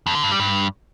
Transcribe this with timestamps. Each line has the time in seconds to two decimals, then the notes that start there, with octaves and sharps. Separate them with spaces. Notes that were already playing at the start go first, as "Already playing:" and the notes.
0.06 F2
0.15 D3
0.23 G2
0.31 G3
0.40 G2